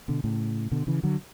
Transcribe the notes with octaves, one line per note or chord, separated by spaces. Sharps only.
B2 D3
A2 C#3
B2 D3
C#3 E3
D3 F#3